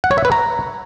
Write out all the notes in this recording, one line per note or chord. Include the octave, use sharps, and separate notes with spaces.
F#5
C#5
E5
B4
A#5